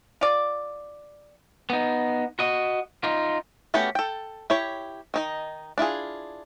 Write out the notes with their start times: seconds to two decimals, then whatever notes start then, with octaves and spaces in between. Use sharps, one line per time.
0.21 F4 D5
1.70 B3 D#4
2.39 F#4 D#5
3.03 D#4 F4
3.74 A3 B3 C#4 F#4 G4
3.95 A4 G5
4.50 E4 G4 C#5
5.14 D#3 D#4 D#5
5.78 D4 E4 F4 G#4